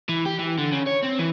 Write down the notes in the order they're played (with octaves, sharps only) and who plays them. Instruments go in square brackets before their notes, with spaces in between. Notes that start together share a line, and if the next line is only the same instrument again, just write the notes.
[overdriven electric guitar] E3
G4
E3
D3
C#3
C#5
C4
E3